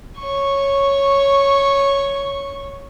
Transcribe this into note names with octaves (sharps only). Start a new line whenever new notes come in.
C#5 C#6